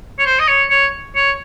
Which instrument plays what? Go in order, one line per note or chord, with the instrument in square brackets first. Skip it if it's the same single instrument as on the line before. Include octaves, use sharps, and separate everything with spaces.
[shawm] C#5
C5
D#5
C#5
C#5
C#5